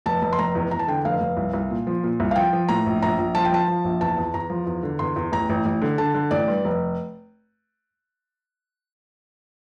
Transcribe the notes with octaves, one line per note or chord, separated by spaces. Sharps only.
F1 A5
F1
C6
F1 A#5
E2
E2 A#5
A5
D3 G5
F1 F5
F1
C2
C2
A#2
F3
A#2
C2
F5
F3 G5
F3
A2 A#5
A#1
A#1 A#5
A#1
F3 A5
G5
F3 A5
F3
A#1
E2 A5
E2
E2 A#5
F3
E2
D3
E2 C6
E2
A1 A#5
A1
A1
D3
D3 A5
D3
A1 D5
G2
F1